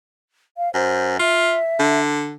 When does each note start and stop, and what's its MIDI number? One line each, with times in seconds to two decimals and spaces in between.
0.57 0.72 77
0.74 1.15 42
0.74 1.19 72
1.19 1.56 65
1.19 2.00 76
1.80 2.36 50